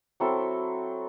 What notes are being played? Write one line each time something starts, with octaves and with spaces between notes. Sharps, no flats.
F#3 C4 E4 A4